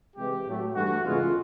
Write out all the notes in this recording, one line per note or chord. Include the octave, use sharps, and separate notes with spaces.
C3 E3 G#3 G4
A2 F#3 A3
G2 E3 A3 F#4
E2 C#3 E3 G#3 F4